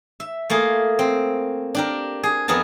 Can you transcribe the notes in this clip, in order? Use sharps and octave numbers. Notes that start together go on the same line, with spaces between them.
E5
A3 A#3 F4 G#4
C4
D4 G4 A#4
G#4
F2 B3 G#4 A#4 A5